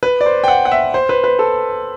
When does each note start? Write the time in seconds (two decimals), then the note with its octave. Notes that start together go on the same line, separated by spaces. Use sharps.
0.03 B4
0.21 D5
0.26 C5
0.44 G5
0.48 F#5
0.65 F#5
0.72 E5
0.94 C5
1.09 B4
1.24 B4
1.39 A4